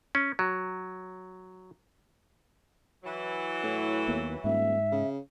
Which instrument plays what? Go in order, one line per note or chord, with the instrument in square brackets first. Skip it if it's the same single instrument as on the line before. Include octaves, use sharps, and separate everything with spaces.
[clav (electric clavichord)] C#4
F#3
[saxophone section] E3 F#3
[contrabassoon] A2
[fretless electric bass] D#2 A#3 B3
[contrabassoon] D#1 [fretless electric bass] G#2 [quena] E5
[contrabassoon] C#3